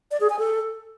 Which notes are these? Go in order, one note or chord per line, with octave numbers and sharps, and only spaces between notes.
D5
G#4
G#5
A4